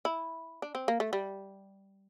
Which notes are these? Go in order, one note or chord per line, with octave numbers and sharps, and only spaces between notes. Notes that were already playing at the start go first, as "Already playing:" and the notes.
E4
D4
C4
A#3
A3
G3